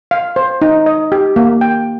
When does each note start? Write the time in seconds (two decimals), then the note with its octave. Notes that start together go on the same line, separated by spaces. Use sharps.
0.11 F5
0.36 C5
0.62 D#4
0.86 D#5
1.12 G4
1.36 A#3
1.61 G5